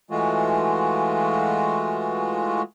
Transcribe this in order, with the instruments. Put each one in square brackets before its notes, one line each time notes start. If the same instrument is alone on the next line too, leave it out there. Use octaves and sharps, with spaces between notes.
[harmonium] E3 G#3 A3 F4 F#4